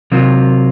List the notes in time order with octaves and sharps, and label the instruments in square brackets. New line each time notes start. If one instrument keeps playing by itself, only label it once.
[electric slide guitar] C3 D#3 F#3 F4